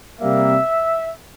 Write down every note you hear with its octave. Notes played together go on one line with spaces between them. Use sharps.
C3 G3 A#3 E5